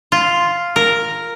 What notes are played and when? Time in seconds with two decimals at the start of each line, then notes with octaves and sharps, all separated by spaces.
0.12 F4
0.76 A#4